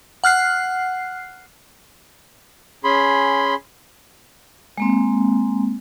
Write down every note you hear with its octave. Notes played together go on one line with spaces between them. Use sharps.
F#5 F6 F#6 C7
C#4 G#4 B5 C6
G#3 A#3 C4